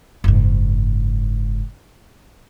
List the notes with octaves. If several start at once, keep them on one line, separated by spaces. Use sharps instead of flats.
F#1 G#2